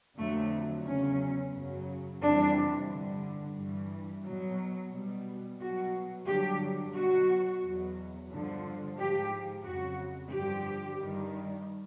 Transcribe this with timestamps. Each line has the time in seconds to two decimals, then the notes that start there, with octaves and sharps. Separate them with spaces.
0.18 F2 D3 F#3 A3
0.85 E2 C#3 F#3 C#4
1.53 F#2 C#3 F#3
2.21 F2 C3 E3 G3 D4
2.89 G2 D3 G3
3.56 G2 E3 G3
4.24 B2 F#3
4.91 B2 G3
5.60 B2 F#3 F#4
6.27 G2 D3 F#3 G4
6.94 B2 F#3 F#4
7.62 E2 B2 F#3
8.31 G2 D3 F3
8.97 G#2 F3 G4
9.65 F2 C#3 F#3 F#4
10.32 G2 D3 F3 G4
11.00 G2 D#3 G3